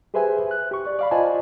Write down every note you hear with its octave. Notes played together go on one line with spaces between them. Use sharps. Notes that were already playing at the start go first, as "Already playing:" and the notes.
G4 G#4 B4 C5 E5 G#5
F#6
G4 C#6
D5
D5 F5 B5
F4 C5 D5 D#5 G#5 A5